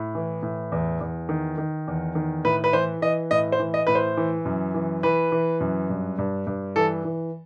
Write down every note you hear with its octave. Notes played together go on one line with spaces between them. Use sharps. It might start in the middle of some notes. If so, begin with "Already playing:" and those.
Already playing: A2
E3
A2
E2
E2
D#3
D#3
E2
D#3
A2 B4
B4
E3 C5
E3 D#5
A2 D#5
C5
E3
D#5
A2 B4
C5
E3
F#2
E3
E3 B4
E3
F#2
G2
G2
G2
E3 A4
E3